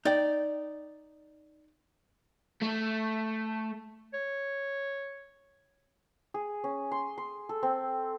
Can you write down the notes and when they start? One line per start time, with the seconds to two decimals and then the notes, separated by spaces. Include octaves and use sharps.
0.05 D#4 D5 G5
2.61 A3
4.14 C#5
6.34 G#4
6.64 C#4
6.91 C6
7.18 C6
7.49 A4
7.63 C4